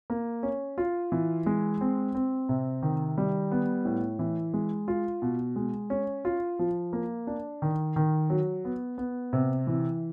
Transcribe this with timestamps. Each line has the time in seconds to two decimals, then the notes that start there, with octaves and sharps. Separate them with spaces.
0.10 A#3
0.43 C#4
0.78 F4
1.12 E3
1.46 G#3
1.81 C4
2.15 C4
2.49 C3
2.83 D#3
3.18 G3
3.51 B3
3.85 A2
4.19 E3
4.54 G#3
4.88 F4
5.22 B2
5.56 G#3
5.90 C#4
6.25 F4
6.59 F3
6.93 A#3
7.27 D4
7.62 D#3
7.96 D#3
8.30 F#3
8.65 B3
8.98 B3
9.33 C3
9.67 E3